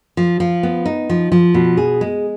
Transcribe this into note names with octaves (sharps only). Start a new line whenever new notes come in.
F3
F3
B3
D#4
F3
F3
B2
G#4
G#3